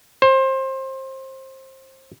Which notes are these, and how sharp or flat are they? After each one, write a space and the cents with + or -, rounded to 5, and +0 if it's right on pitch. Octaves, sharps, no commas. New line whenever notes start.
C5 +25